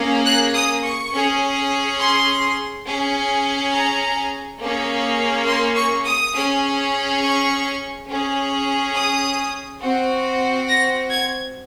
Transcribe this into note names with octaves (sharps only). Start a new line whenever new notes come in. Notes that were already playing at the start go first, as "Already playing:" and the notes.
Already playing: A#3 C#4 G#4
F#6
D#6
C#6
C#4 G#4
C6
C#4 G#4
A#5
A#3 C#4 G#4
C6
C#6
D#6
C#4 G#4
C#6
C#4 G#4
D#6
C4 F#4
A#6
G#6